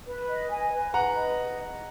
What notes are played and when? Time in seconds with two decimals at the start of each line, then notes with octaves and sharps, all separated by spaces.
0.06 B4
0.28 D#5
0.50 G#5
0.73 B4
0.94 B4 F#5 A#5
1.16 D#5